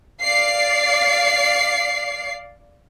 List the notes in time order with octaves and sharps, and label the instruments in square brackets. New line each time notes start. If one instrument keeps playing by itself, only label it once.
[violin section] D5 F5 C7